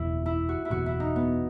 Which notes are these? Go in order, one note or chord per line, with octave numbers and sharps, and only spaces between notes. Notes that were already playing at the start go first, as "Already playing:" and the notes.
Already playing: F#1 E2 B2 E4
E4
F#4
E4
F#1 E2 B2 F#4
E4
D#4
B3